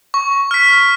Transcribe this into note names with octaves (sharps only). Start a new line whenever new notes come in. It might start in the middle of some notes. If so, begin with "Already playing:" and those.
C#6
F6 B6